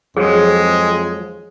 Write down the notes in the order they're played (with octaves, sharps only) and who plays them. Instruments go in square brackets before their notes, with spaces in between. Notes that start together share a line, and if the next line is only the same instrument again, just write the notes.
[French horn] F2 [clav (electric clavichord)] F3 F#3 [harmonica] G#3 [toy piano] G#4